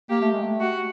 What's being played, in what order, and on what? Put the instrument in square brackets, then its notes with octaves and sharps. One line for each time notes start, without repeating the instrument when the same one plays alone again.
[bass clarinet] A#3 [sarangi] G4
[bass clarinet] A3
G#3
A3
[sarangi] F#4